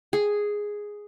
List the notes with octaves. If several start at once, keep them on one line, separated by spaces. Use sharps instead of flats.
G#4